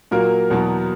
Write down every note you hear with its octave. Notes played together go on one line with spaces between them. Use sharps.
A#2 F#3 A#3 A#4
E2 B2 F#3 B3